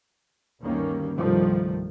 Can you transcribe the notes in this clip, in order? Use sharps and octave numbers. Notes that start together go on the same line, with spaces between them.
D2 G2 D#3 G3 A#3 C#4
C2 G2 D#3 F3 A3